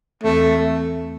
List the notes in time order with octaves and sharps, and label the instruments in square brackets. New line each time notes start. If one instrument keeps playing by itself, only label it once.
[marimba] E2 E3 C4 [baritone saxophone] A3